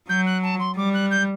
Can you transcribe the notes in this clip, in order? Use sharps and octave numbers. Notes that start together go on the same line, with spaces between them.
F#3 G6
F#6
A5
C6
G3 D6
F#6
G6